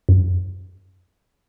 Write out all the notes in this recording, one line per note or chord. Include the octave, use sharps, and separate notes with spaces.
F#2